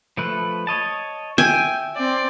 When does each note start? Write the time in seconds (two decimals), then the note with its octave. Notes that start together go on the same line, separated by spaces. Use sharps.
0.17 F3 A3 B4
0.67 C#5 D#5 A5
1.38 E5 G5 G#5
1.96 C4 D5